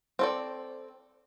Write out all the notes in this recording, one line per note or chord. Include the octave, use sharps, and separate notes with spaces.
C4 A4 D5